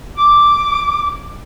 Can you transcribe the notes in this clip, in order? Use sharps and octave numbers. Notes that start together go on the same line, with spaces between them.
D6